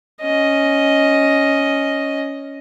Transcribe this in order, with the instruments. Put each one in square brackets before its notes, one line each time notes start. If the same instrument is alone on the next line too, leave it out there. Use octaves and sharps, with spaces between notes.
[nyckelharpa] C#4 D#5